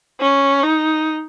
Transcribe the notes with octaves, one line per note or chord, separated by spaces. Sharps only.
C#4
D#4